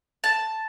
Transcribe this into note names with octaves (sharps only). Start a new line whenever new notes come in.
A5